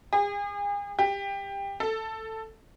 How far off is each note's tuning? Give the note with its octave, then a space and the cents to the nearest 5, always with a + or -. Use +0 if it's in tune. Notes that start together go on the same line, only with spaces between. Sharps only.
G#4 -40
G4 +20
A4 +10